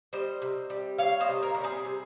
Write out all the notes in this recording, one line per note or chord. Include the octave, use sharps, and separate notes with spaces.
G3 C5 D#5
C3
G3
C3 C#5 F5
C5 D#5
C3
A#4 C#5
G3 A#4
G#4 C5
C3